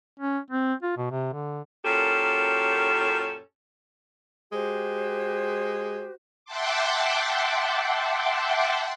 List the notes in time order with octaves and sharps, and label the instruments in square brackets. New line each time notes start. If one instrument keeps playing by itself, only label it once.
[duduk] C#4
C4
F4
B2
C3
D3
[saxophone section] F#2 A#2 C#4 G4 A4
[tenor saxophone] G#3 [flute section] F#4 G4 C5
[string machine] E5 F#5 G5 A5 C6 D6